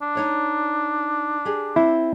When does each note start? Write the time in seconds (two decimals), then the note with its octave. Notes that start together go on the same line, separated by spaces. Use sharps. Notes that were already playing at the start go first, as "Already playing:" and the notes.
0.02 D4
0.15 D#4 C#5 D5
1.45 G4 G#4
1.76 C4 E4